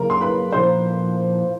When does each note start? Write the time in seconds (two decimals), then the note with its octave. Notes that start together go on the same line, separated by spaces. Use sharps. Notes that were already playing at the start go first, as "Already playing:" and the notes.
Already playing: C#3 F#3 A#3 A#4 A#5
0.10 C6
0.21 B4 B5
0.52 A#2 F3 A#3 C5 C6